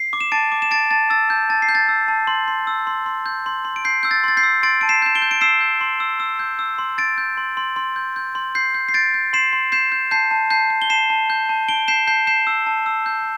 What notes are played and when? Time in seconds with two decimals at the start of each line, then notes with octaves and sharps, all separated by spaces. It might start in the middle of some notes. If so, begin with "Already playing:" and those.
Already playing: C7
0.13 D6
0.20 E7
0.32 A5 A6 D7
0.52 D6
0.62 E7
0.71 A5 A6 D7
0.91 A5 A6
1.10 E6 A6
1.30 A5 G6
1.50 A5 A6
1.62 C7
1.69 G6
1.75 A6
1.89 E6
2.08 A5
2.27 C6
2.48 C6
2.67 E6
2.87 C6
3.06 C6
3.26 G6
3.46 C6
3.65 C6
3.76 D7
3.85 G6 C7
4.03 E6 G6
4.11 A6
4.24 C6 A6
4.37 G6 C7
4.43 E6
4.63 C6 A6 D7
4.81 A5 D7
4.89 C7 E7
5.02 G6 E7
5.15 D7 G7
5.22 G6
5.31 D7
5.41 E6 C7 E7
5.61 G6
5.81 C6
6.00 E6
6.20 E6
6.39 G6
6.59 E6
6.78 C6
6.98 C6 A6 D7
7.18 G6
7.37 C6
7.57 C6
7.76 C6
7.96 G6
8.16 G6
8.35 C6
8.55 G6 C7
8.74 G6
8.89 C7
8.94 G6 A6 D7
9.14 G6
9.33 C6 C7 E7
9.53 C6
9.72 G6 C7 E7
9.92 G6
10.11 A5 G6 C7
10.31 A5
10.50 A5 G6 C7
10.70 G6
10.82 G7
10.90 A5 C7 E7
11.10 A5
11.30 G6
11.49 A5
11.68 A5 D7 G7
11.88 G6 C7 E7
12.07 A5 G6 C7
12.27 G6 C7 E7
12.47 E6
12.67 A5
12.86 E6
13.06 G6